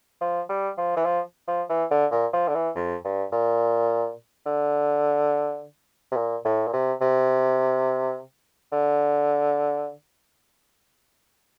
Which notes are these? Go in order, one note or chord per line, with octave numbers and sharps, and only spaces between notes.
F3
G3
F3
E3
F3
F3
E3
D3
A#2
F3
D3
E3
F2
G2
A#2
D3
C3
A#2
A2
A#2
C3
C3
D3